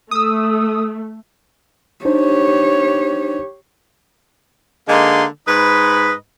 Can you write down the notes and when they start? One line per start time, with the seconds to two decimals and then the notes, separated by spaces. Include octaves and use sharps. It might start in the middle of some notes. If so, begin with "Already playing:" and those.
0.11 A3 D#6 E6
2.05 D4 D#4 G4 C5 C#5
4.89 D3 G#3 A#3 D#4 C6
5.47 G#2 B4 D#5 B5